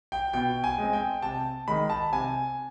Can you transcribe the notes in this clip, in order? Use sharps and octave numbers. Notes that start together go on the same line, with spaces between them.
G5
B2 G5
G#5
G#3 C4
G5
C3 A5
D#3 G#3 B5
A5
C3 G#5